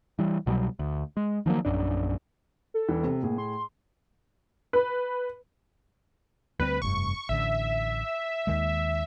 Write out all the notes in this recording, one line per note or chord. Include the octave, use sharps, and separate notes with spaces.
E3 G3
C2 B2 F#3 G3
D2
G#3
D#3 F3 F#3 A#3
A#1 F#2 D4
A4
E1 E3
C3
A2 A#3 G#4
C6
B4
D2 G3 C4 B4
F1 G2 C#6
A1 D3 E5
D#2 D#3 G#3